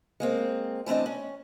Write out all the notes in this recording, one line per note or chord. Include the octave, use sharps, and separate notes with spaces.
G#3 A#3 C4
E3 A3 C4 D4 D#5
C#4